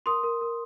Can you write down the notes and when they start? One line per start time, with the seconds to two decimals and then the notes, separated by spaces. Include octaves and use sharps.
0.06 A#4 C6 D#6
0.24 A#4
0.41 A#4